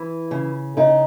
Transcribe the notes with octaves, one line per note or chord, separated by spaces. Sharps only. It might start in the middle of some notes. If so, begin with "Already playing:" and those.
Already playing: E3
C#3
C#3 D#4